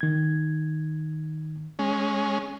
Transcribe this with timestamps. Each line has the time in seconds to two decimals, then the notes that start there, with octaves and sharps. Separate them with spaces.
0.01 D#3 G#6
1.79 G#3 C#4